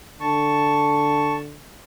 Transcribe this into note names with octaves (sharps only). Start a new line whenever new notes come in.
D3 A5 C#6